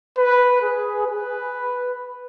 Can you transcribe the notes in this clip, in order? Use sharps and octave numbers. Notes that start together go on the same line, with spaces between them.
B4
G#4
B4